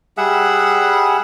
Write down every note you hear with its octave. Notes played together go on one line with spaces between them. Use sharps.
G3 G#4 E5 F#5